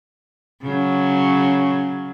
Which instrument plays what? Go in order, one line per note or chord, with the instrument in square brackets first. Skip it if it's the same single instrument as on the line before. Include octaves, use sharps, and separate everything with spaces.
[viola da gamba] C#3 F#3